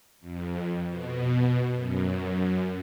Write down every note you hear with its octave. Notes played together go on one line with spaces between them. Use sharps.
F2
B2
F#2